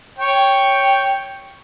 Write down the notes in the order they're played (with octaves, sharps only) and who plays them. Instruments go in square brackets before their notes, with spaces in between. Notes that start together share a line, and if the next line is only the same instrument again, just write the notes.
[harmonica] C#5 G5